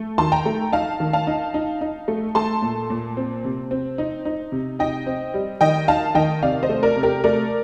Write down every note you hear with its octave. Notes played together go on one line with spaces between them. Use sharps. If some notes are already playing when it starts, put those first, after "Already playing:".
Already playing: A3
D#3 A5 C6
G5 A#5
A3
D#4 F5 A5
D#3
F5 A5
D#4
D#4
D#4
A3
A3 A5 C6
A#2
A#2
C4
C3
C4
D#4
D#4
C3
D#4 D#5 G5
C4
G3
D#3 D#5 G5
D#4 F5 A5
D#3 D#5 G5
C3 D5 F5
C5 D#5
A3
A#4 D5
C3
G4 A#4
A3 A#4 D5